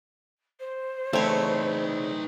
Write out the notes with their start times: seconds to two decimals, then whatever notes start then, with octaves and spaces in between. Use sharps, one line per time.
0.60 C5
1.13 E2 C#3 A3 C4 D#4 B4 C#5